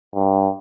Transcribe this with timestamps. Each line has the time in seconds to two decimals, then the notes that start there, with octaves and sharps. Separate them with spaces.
0.15 G2